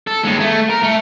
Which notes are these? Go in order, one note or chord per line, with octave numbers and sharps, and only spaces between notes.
A4
D#2 G#3
A3
A#4
A3